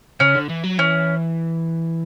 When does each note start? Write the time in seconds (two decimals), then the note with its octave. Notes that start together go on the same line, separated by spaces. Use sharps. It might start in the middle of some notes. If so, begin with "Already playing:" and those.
0.20 C#3 C#4
0.35 D3
0.50 E3
0.64 F#3
0.79 E3 C#4